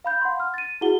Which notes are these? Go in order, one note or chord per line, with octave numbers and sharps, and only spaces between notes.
F5 B5 G6
F#5 C6
F6
A6 D#7
E4 F#4 G#4 F#5 G7